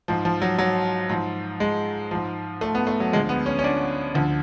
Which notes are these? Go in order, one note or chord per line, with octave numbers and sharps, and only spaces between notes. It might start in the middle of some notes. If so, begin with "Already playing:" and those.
G#2 F3
F3
F#3
F#3
G#2 F3
G#3
G#2 F3
A3
B3
A3
F#3
D2 D3 F3 G#3
B3
C#4
C#4
D4
D2 D3 F3